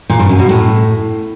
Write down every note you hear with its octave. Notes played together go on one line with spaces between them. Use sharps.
A#2
G2
F#2
B2
A2